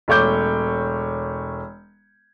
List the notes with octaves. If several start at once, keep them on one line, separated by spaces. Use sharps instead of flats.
E1 A3 C#5 D6 G6